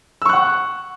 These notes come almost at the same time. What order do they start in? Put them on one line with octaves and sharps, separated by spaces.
E6 C#6 F#6 F#5